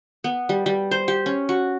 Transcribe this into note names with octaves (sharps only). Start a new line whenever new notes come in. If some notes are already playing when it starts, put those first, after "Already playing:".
B3
G3
G3
C5
G4
C#4
F#4